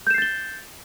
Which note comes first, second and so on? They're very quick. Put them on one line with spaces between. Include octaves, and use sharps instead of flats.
G6 E7 C7 A6 G7